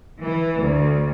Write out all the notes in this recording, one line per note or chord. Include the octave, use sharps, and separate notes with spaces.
E3
D2